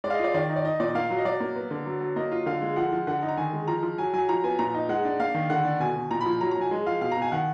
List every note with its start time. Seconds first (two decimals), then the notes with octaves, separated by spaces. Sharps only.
0.04 G#3 D5
0.10 F5
0.14 D#5
0.19 F4 D5
0.34 D#3 D5
0.49 D#4
0.56 D5
0.65 D#4 D#5
0.80 A#2 D5
0.95 A#3 F5
1.10 F#3
1.18 D#5
1.25 F#3 D5
1.40 A#3
1.56 B3
1.71 D3
1.86 F#3
2.01 F#3
2.16 A#3 D#5
2.31 F4
2.46 D3 F5
2.62 G#3
2.76 F3 F#5
2.92 F3
3.07 D3 F#5
3.22 D#4
3.28 A#5
3.37 D#3 G#5
3.53 G#3
3.68 F3 A#5
3.83 F3
3.98 F#3 G#5
4.13 F#3 G#5
4.28 F3 A#5
4.44 B3 G#5
4.59 A#2 A#5
4.74 D#4
4.89 G#3 F#5
5.05 D4
5.20 A#3 F5
5.34 D#3
5.50 D3 F#5
5.65 D4
5.80 B2 G#5
5.95 B2
6.11 A#2 A#5
6.21 B5
6.26 F3
6.41 F#3 A#5
6.51 A#5
6.56 F#3 G#5
6.71 G#3
6.86 F3 F5
7.01 B2 F5
7.12 A#5
7.17 B2 G#5
7.27 G#5
7.32 D#3 F#5